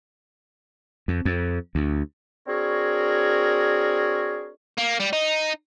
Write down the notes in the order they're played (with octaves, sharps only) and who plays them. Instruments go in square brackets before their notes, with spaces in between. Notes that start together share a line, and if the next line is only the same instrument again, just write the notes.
[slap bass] F2
F2
D2
[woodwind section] C4 D4 F#4 G#4 A#4 C#5
[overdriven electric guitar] A#3
G3
D#4